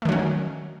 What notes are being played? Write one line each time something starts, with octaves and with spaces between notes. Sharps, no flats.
D#3 F#3 A3 C#4